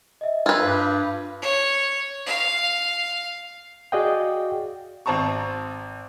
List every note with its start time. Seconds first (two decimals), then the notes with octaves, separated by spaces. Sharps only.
0.21 D#5 E5
0.46 F4 B4 E6 G#6
0.63 G2 F5
1.42 C#5
2.26 F5
3.92 F#4 G#4 D5 D#5 F5 G5
5.06 G#1 C4 A5 A#5 C#6